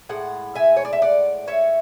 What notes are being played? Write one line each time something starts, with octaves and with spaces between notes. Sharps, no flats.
A2 G#3 F#5
E5 G#5
C#5
D5
E5
D5 F#5
C#5 E5